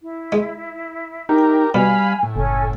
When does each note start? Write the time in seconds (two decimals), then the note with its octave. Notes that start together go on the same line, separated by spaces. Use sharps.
0.02 E4
0.32 G#3
1.29 D#4 G4 A#4
1.74 B2 G3 F5 G#5 B5
2.23 A2
2.36 F#1 C#4 A4 G#5